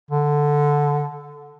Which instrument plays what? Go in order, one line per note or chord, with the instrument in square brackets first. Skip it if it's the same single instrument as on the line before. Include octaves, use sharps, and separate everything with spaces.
[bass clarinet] D3